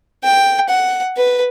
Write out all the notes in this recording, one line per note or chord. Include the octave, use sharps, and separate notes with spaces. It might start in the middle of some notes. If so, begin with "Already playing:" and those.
G5
F#5
B4